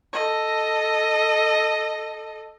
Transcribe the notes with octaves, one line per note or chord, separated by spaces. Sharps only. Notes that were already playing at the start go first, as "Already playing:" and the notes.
A4 D#5